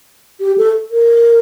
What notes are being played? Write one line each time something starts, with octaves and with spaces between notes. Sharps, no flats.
G4
A4
A#4